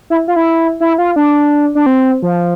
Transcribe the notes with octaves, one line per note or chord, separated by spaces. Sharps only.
E4
F4
E4
E4
F4
D4
D4
C4
F3